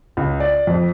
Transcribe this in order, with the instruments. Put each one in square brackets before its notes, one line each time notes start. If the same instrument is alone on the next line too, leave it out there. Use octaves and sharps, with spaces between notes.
[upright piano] C#2
D5
F2